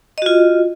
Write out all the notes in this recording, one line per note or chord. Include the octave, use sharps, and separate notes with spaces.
F4 F#4 D#5